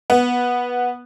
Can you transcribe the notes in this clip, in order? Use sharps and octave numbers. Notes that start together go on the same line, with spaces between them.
B3